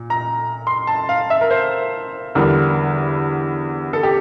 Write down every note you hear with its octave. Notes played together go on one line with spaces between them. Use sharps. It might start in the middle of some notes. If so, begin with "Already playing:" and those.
Already playing: A#2
A#5
C6
A5
F5
E5
A#4
C5
E2 D3 G3 A#4
A4
G4